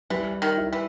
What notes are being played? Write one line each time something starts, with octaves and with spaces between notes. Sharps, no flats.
E3 G3
D#3
E4
E3